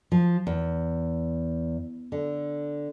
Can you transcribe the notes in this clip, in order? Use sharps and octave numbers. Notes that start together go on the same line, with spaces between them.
F3
E2
D3